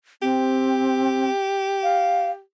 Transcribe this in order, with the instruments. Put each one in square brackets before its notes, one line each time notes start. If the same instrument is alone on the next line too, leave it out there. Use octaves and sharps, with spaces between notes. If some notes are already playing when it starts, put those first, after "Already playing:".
[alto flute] C4 [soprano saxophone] G4
[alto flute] F5